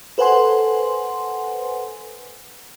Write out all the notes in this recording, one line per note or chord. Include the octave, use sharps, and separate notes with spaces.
A4 B4 C5 F#5 G#5 C6